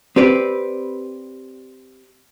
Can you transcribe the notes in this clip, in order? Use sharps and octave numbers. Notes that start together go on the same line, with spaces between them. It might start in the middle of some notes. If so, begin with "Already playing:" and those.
C4 G4 B4 D5